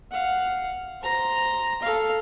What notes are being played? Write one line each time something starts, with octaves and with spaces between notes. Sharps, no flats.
F5 F#5
C5 A#5
A4 F5